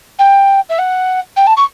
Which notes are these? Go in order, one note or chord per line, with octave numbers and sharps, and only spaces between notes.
G5
E5
F#5
G5
A5
C#6